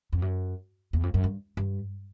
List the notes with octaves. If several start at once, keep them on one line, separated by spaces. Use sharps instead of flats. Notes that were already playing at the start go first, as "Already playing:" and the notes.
F2
F#2
E2
F2
F#2
G2
G2